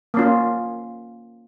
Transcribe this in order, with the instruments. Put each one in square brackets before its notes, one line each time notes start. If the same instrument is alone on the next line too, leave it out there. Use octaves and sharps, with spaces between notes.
[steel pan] A#3 C#4 F4